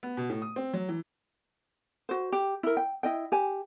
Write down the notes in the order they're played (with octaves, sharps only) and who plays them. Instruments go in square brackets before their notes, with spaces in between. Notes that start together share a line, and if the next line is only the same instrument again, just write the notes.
[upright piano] B3
B2
A2
D#6
C4
F#3
E3
[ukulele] F#4 C5
G4
E4 A#4
G5
E4 D#5 G5
G4 G#5